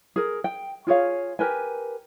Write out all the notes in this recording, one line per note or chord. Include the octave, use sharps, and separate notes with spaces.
G#4 A#4
G5
F4 G#4 C#5 F5
G4 A#4 B4 G#5